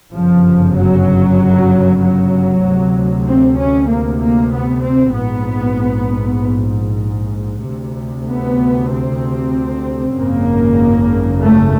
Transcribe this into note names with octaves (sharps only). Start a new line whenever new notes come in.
G1 F#2 C#3 F3
F#3
F#3
D2 C3
C4
C#4
A#3
A#3
B3
C4
A#1 G#2 B3
D2 C3
B3
C4
G#1 F#2 C#3 A#3
A3